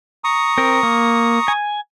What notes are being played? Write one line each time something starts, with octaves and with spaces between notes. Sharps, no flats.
A#5 C#6 D#6
C4 A#4
A#3
G#5